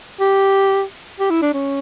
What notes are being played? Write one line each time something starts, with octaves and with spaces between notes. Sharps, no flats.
G4
G4
E4
D4
C#4